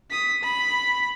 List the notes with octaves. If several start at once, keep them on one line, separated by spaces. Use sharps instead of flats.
D#6 B6
B5